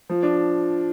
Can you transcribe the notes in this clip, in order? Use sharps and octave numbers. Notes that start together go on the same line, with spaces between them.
F3
D4